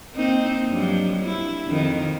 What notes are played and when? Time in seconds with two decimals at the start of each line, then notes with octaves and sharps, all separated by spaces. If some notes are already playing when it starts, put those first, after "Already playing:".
0.14 A#3 C4 D#4
0.69 G2 F3 F#3
1.25 E4
1.68 F2 D#3